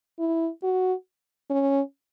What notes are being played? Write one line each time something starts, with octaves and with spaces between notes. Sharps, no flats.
E4
F#4
C#4